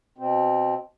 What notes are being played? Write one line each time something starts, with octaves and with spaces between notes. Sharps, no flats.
B2 C4